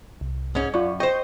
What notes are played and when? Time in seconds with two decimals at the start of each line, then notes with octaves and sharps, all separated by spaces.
0.21 C2
0.55 G#2 C#4
0.74 F#2 F4 D5 C#6
1.00 C5 D#5 G5 C#6 G6